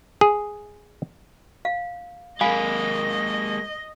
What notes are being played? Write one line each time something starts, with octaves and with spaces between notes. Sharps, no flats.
G#4
F5
G#3 A#3 D#5 F5 G#5 B5